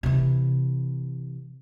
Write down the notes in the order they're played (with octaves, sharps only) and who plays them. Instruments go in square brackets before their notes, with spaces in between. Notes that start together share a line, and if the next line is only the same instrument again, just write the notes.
[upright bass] C3 E3